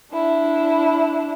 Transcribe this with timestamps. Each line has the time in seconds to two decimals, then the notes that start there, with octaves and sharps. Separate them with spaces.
0.13 D4 E4